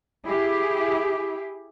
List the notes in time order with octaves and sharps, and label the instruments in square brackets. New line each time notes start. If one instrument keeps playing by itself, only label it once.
[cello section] E4 G4 G#4